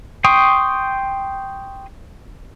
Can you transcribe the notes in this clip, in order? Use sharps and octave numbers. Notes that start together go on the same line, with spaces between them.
G5 C6 C#6 D#6